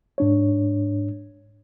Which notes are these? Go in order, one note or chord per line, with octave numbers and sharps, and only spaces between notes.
G#2 D4 C#5